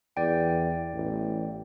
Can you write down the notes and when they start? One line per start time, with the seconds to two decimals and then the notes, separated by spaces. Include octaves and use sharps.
0.17 E2 D5 G5
0.94 A1